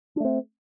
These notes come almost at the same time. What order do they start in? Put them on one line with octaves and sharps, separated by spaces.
D4 A3 C4